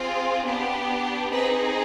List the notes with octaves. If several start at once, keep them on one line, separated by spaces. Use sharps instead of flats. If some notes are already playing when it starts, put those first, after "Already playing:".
Already playing: C4 F4 G#4
B3 D4 G4
C4 D#4 G#4 B4